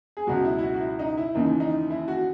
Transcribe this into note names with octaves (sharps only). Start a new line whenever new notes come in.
G#4
C#2 B2 F#3 F#4
E4
E4
F#4
F#4
E4
D#4
E4
D#2 C#3 E3 D#4
D#4
E4
F#4